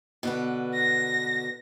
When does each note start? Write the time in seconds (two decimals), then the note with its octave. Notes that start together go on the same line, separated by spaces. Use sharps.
0.23 B2 D3 B4
0.74 A#6